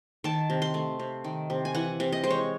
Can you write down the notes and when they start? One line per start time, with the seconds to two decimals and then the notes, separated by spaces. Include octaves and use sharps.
0.24 D#3 A5
0.50 C3
0.62 C6
0.74 A3
1.00 C3
1.24 D#3
1.50 C3
1.65 G#5
1.75 E3 F#5
2.00 C3
2.12 D#5
2.24 G#3 C5
2.30 C#5